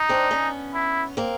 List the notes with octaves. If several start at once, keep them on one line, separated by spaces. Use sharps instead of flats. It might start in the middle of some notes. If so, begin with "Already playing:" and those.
Already playing: D#4
C4 D4
B3 C#4
E4
A#3 C4